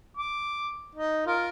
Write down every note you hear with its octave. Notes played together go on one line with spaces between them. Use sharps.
D6
D#4
F4 A#4